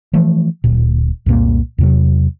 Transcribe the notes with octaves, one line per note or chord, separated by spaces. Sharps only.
E3 F3 A3
D1 A#2
C2 F2 A#2 A#3
E2 C3 F#3